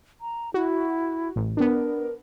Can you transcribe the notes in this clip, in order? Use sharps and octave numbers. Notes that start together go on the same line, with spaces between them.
A#5
E4 F#4
A1
B3 D4 A#4